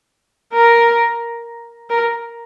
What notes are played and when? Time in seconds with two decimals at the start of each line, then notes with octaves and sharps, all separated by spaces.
0.54 A#4
1.90 A#4